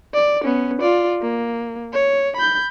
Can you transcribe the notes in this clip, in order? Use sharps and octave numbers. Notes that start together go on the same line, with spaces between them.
D5
B3 C#4
F4 D5
A#3
C#5
B5 G6